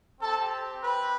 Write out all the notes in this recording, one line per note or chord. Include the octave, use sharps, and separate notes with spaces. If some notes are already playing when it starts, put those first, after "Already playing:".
C4 G4 A4 A5
B4 B5